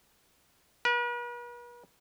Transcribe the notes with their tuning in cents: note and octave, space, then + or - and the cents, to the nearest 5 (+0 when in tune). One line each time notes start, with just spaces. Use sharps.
B4 -45